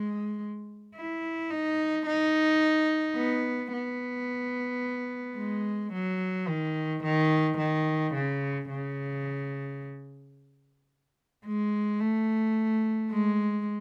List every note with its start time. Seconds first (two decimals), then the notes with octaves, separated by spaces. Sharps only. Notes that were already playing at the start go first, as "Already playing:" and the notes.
Already playing: G#3
0.96 E4
1.51 D#4
2.07 D#4
3.17 B3
3.73 B3
5.38 G#3
5.93 F#3
6.48 D#3
7.04 D#3
7.58 D#3
8.15 C#3
8.69 C#3
11.45 G#3
12.00 A3
13.11 G#3